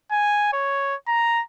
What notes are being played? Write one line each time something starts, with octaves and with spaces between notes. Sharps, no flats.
G#5
C#5
A#5